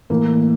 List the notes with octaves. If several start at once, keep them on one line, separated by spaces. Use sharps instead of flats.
A2 E3 A#3